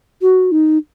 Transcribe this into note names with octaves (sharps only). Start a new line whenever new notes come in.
F#4
D#4